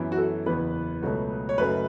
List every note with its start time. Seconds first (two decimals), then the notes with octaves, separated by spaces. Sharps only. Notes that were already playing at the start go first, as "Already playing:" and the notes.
Already playing: F#2 E3 B3
0.12 F#4
0.17 A4
0.46 F#1 E2 E3 B3 B4
1.02 C#2 B2 F#3 A3
1.49 C#5
1.58 F#1 F#2 F#3 A3 B4